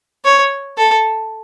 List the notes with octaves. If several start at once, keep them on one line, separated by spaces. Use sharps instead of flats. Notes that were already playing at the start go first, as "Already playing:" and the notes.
C#5
A4